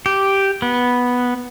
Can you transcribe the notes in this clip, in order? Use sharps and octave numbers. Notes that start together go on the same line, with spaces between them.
G4
B3